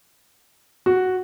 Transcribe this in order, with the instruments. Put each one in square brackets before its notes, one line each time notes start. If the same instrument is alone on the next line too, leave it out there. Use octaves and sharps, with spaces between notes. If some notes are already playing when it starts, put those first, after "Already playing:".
[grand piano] F#4